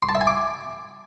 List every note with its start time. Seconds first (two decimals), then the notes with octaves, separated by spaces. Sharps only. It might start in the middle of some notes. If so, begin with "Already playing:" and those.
0.03 C6
0.09 A5
0.15 E5
0.21 G#5
0.27 D6